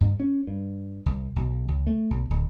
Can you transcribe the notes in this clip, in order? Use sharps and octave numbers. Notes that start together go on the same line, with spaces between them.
G2
C#4
G2
C2
B1
C#2
A3
B1
D1